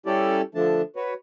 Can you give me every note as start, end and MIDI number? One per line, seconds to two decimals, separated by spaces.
0.06 0.42 55
0.06 0.42 61
0.06 0.42 64
0.06 0.42 67
0.06 0.42 69
0.06 0.42 74
0.55 0.82 50
0.55 0.82 53
0.55 0.82 57
0.55 0.82 62
0.55 0.82 81
0.96 1.14 66
0.96 1.14 71
0.96 1.14 73